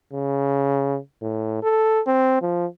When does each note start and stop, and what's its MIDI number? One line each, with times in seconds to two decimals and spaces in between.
0.13 0.98 49
1.22 1.59 45
1.63 2.01 69
2.07 2.42 60
2.42 2.66 53